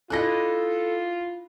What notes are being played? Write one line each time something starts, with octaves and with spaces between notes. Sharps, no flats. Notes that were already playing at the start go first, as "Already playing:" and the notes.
D4 E4 F4 A4 D#5 F#6 A#6